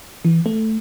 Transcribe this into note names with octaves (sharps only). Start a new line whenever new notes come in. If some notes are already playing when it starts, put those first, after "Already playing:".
E3
A3